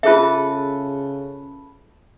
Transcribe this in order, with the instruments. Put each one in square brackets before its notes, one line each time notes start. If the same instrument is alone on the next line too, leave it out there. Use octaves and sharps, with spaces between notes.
[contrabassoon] C#3 [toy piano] F4 G#4 E5 [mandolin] A4 B4